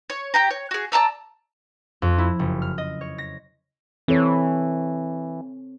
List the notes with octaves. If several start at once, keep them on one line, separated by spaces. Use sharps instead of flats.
C#5
G4 G5 A#5
C#5
F#4 G#4
D5 A5 A#5 E6
F2
E4
F#1
F6
D#5
C#5
A#6
E3 C4 A4 C#5